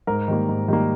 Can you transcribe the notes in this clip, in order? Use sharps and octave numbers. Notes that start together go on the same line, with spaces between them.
G#2 A#4
D#3 G3 A#3
G#2
D#3 G3 A#3